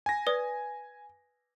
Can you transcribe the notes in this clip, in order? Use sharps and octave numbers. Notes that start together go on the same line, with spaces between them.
G#5 A#6
B4 D5 D#6